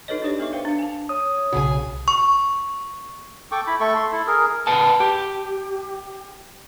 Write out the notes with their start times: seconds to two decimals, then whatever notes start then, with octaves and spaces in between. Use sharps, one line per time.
0.08 D#4 F#4 A4 B4 C#5 D#5
0.22 D4 F#4 G4 C#5 D5
0.39 B3 A4 E5 C#6 D6
0.52 B4 C5 F5 G5
0.65 D4 F5
0.79 G#5 A5
1.09 C#5 D#6
1.53 B1 C#3 F#4 G#4 G#5
2.08 C#6
3.52 A4 G5 C#6 D6
3.67 E4 B5
3.80 A3 A4 C#6
3.96 C6
4.12 E4 A4
4.27 G#4 A#4
4.67 B4 F#5 A5
5.00 G4